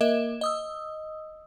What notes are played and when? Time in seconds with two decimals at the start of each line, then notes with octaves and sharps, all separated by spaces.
0.01 A#3 A#4 D#5 E5 E7
0.41 D#5 D#6 E6